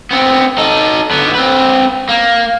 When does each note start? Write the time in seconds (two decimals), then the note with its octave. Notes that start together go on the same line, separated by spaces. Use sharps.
0.11 B3 C4
0.58 D#4 A4
1.11 D3 B3
1.35 C4 B4
2.09 A#3